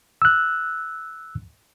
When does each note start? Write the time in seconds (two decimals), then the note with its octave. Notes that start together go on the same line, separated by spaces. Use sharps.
0.22 E6 F#6